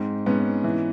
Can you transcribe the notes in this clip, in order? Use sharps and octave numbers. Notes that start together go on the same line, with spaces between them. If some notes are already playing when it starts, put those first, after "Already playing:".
Already playing: G#2 C4
G#2 B3 C#4
E3